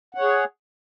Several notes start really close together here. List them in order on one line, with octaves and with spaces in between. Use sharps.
F#5 C#5 G#4